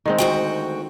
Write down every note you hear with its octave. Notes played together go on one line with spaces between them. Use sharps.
D#3 G#3 C4
D2 F#4 G5